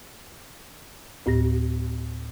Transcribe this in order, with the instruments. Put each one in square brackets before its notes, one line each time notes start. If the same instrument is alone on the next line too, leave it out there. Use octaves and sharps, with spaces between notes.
[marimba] D2 A2 G4 A#6